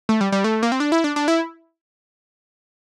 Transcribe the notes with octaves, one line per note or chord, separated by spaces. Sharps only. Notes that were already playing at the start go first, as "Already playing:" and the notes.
A3
G3
G3
A3
A#3
C4
D4
E4
D4
D4
E4